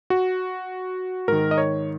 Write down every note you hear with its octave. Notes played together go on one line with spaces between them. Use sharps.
F#4
G#2 D#3 A#4
D#5
C#5